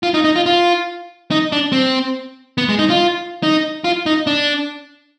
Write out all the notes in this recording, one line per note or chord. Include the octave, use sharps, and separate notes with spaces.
F4
D#4
D#4
F4
F4
D#4
D4
C4
B3
G#3
D#4
F4
D#4
F4
D#4
D4